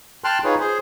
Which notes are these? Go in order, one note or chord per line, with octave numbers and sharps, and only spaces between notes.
G5 A5 C6 F6 F#6
D#4 F4 G#4 B4 C#5
G#4 C5